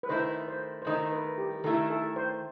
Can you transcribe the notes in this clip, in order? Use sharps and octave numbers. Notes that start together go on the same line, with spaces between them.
B4
D#3 A3 E4 C5
C5
C5
D#3 A3 E4 D#5
B4
G4
D#3 A3 E4 A4
A4
C5